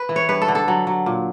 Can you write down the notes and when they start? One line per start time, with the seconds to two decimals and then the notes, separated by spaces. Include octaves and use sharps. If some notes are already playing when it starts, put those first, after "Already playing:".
Already playing: B4
0.09 E3
0.16 C#5
0.29 G2 B4
0.42 A4
0.48 D3
0.55 A4
0.68 F#3
0.87 F#3
1.06 A#2